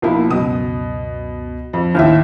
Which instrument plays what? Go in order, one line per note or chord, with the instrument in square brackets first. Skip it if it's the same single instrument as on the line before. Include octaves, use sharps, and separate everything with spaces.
[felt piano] B1 E4 [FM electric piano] F3 A#3
[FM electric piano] C#2 F#2 [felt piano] B2 D#6
[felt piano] F2
[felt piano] D#2 A2 E5 [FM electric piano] F5